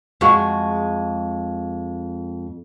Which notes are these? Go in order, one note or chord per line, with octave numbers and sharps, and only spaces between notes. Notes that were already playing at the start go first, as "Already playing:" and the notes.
F2 G#3 F#4